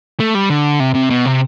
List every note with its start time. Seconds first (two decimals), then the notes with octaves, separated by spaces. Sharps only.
0.20 A3
0.35 G3
0.50 D3
0.80 C3
0.95 C3
1.10 B2
1.25 C3